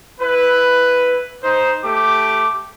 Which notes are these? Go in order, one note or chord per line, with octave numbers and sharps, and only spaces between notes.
E4 B4
D#4 C5
A3 G4 D6